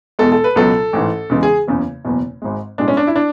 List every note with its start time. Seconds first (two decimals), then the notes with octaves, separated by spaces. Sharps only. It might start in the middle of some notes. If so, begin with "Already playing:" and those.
0.19 E2 B2 G#3 A4
0.32 A4
0.44 B4
0.56 C#2 B2 F#3 A4
0.93 A1 G#2 E3
1.30 E2 C#3 E3 G#3
1.43 G#4
1.68 F#1 E2 C#3
2.05 F#1 E2 B2
2.42 G#1 G#2 G#3
2.78 B1 A2 G#3 D4
2.88 C#4
2.97 D4
3.07 E4
3.16 D4